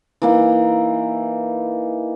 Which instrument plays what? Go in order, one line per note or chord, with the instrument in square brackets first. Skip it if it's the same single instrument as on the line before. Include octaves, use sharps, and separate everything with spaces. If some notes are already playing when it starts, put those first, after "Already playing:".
[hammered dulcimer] E3 A#3 D#4